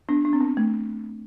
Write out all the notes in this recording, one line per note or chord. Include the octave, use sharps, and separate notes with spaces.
B3 D4
D4
C4
B3
A3